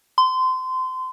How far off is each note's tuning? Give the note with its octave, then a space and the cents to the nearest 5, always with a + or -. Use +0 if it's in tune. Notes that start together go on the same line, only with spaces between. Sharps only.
C6 -25